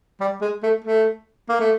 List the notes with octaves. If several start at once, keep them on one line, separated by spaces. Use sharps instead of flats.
G3
G#3
A3
A3
A#3
A3